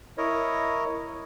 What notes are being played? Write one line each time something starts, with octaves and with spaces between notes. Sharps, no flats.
E4 A#4 C#5 D#5